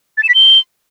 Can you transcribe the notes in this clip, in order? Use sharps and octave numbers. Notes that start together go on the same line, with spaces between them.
A6
E7
B6
G7